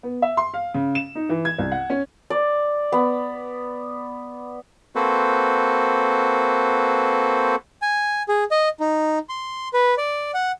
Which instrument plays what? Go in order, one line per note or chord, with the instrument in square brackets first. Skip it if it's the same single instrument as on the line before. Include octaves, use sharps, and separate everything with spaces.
[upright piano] B3
E5
C6
F5
C#3
E7
D#4
E3
G#6
C2
F#5
C#4
[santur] D5
B3
[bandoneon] A#3 C4 F#4 A4 B4 C5
[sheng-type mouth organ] G#5
G#4
D#5
D#4
C6
B4
D5
F#5